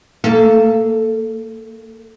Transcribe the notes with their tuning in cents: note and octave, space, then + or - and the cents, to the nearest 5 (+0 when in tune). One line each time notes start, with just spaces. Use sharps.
A#3 -30 A4 +0